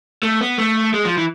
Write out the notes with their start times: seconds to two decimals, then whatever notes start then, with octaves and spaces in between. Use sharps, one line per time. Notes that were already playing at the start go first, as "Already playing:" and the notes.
0.23 A3
0.41 B3
0.58 A3
0.94 G#3
1.05 F3
1.17 E3